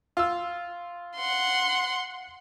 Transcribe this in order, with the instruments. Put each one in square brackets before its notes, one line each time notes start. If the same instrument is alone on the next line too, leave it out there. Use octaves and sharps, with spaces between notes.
[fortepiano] F4 E6
[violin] F#5 C6